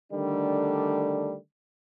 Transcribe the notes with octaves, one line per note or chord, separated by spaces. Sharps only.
D3 D#3 G3 A3 D4